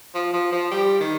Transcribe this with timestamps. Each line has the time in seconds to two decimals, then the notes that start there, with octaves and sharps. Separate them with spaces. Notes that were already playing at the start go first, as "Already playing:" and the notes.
0.15 F3
0.33 F3
0.52 F3
0.71 G3
1.00 D#3